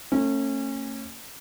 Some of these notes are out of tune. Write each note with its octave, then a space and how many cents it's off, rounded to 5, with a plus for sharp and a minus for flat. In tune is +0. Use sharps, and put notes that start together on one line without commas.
A3 +35 C#4 -25